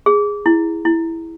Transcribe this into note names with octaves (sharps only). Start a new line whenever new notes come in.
G#4
E4
E4